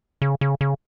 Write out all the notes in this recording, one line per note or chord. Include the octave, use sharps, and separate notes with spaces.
C#3
C#3
C#3